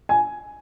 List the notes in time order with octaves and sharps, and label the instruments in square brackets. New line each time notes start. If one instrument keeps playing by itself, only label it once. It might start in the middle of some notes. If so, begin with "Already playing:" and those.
[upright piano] G#5